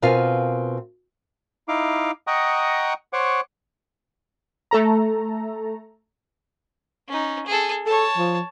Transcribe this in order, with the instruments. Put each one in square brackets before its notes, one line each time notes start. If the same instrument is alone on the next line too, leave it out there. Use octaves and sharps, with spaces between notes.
[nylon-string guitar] B2 C4 F4 A#4 F5 G#5
[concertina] D#4 E4 F5 D6
D#5 F#5 G5 A#5 C#6 D#6
C5 C#5 F#5 C#6 D6
[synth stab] A3 A4 A#5
[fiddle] C#4 D#4
G#4 A4
[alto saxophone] A4 [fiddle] C#5 A5
[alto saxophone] F3